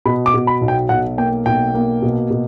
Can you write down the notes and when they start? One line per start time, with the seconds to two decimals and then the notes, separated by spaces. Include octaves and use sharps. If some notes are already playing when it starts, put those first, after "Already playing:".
0.05 B2 B5
0.26 D6
0.34 B2
0.47 B5
0.61 B1
0.68 G5
0.89 B1 F#5
1.18 A#3 G5
1.46 B1 G5
1.75 A#3
2.02 B2
2.30 B2